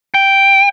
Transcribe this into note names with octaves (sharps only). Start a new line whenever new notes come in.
G5